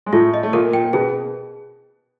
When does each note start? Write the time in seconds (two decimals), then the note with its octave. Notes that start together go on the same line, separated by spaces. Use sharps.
0.06 G#3
0.13 A2 A3 F4
0.34 D#5
0.43 A3
0.53 A#2 A#3 A#4
0.73 G5
0.84 A#3
0.93 B2 B3 G#4